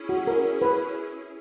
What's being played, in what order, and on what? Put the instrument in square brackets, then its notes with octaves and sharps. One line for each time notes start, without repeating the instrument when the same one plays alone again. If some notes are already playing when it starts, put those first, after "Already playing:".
Already playing: [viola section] C#4 E4 G#4
[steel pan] F#4
A#4
B4